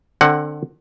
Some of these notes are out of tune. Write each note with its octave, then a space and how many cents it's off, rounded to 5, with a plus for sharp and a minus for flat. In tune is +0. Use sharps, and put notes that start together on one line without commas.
D3 +25 C4 +35 F#5 +5